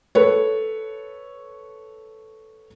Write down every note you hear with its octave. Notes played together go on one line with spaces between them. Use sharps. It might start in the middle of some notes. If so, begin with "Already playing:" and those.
A4 B4 C#5